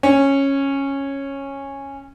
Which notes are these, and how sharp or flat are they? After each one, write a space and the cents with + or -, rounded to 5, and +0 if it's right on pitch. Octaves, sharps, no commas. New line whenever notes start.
C#4 -10